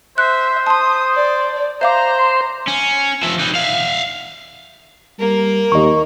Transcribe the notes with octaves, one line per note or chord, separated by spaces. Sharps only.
C5 E5 F#6
A5 C6 D#6
D5
C5 E5 F5 A#5 D6
C6
C#4
F3 E5
D#4 B4
E5 F5
G3 A#3 A#4
D#2 D#5 C#6